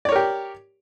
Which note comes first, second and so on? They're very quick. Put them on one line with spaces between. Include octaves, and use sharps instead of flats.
D5 C#5 A#4 G4